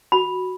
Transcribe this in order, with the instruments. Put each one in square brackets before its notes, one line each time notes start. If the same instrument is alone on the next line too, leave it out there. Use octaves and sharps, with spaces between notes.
[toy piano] F#4 B5